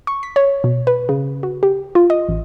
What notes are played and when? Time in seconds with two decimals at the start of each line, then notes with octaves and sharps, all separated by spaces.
0.07 C#6
0.23 B6
0.36 C#5
0.64 B2
0.87 B4
1.09 C#3
1.43 F#4
1.63 G4
1.95 F4
2.10 D#5
2.28 A1